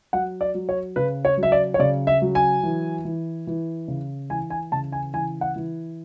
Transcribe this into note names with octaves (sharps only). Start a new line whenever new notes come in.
F#3 F#5
D5
F#3
C#5
C#3 B4
C#5
F#3
E5
D5
C#5
C#3 D5
E5
F#3
G#5
E3
E3
E3
C#3
E3 G#5
G#5
C#3 A5
G#5
E3 G#5
F#5
E3